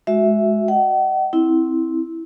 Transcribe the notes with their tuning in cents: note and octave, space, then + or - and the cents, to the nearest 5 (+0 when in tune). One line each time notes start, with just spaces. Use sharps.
G#3 +20 F#4 +0 E5 +0
D#5 +0 F#5 +40
C4 +0 E4 -15